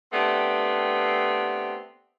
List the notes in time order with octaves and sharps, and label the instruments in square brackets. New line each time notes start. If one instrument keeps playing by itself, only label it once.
[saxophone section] A3 B3 C4 D4 G4